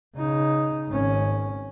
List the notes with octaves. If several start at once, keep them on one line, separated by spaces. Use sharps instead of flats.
C#3 D#4
G#1 C#4